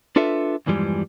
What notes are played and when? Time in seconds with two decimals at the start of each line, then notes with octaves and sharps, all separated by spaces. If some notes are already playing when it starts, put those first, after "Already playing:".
0.16 D4 F4 A4 B4 E5
0.66 E2 G2 E3 F3 G3 G#3